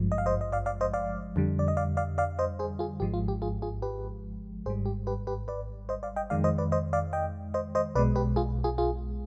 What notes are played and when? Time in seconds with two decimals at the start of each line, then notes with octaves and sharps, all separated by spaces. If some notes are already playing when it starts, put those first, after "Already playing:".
Already playing: G#1 G2 F3 G#3
0.12 D#5
0.18 F5
0.26 C5 D#5
0.41 D#5
0.52 D5 F5
0.66 D5 F5
0.81 C5 D#5
0.94 D5 F5
1.36 F2 D3 G3
1.59 D5
1.68 D#5
1.77 D5 F5
1.97 D5 F5
2.18 D5 F5
2.39 C5 D#5
2.59 G#4 C5
2.79 F4 G#4
3.00 G#1 G#2 F3 G#3 G4
3.14 F4
3.28 G4
3.42 F4 G#4
3.62 F4 G#4
3.82 G4 B4
4.66 G#1 G#2 G3 G#4 C5
4.86 G4
5.07 G4 B4
5.27 G4 B4
5.48 B4 D5
5.89 C5 D#5
6.03 D5 F5
6.16 D#5 G5
6.30 F2 D#3 G#3 D5 F5
6.44 C5 D#5
6.58 B4 D5
6.72 C5 D#5
6.93 D5 F5
7.13 D#5 G5
7.54 C5 D#5
7.75 C5 D#5
7.95 B1 B2 G#3 B4 D5
8.16 G4 B4
8.36 F4 G#4
8.64 F4 G#4
8.78 F4 G#4